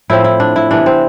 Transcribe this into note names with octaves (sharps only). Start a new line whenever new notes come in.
A2 F3 C4 E4
E4
D4
E4
C3 E3 B3 D4
C4